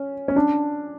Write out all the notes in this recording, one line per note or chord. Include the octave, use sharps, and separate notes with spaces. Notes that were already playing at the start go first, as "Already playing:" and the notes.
Already playing: C#4
C#4
D4